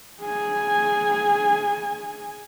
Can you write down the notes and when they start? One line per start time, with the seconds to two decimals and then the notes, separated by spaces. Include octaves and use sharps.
0.22 G#4 G#5